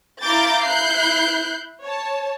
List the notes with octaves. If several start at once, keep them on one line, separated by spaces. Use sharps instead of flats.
E4 F5 A#5 D6 G6 A6
E4 F#6 G6 C7
C#5 A5